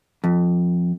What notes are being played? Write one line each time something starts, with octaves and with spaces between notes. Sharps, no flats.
F2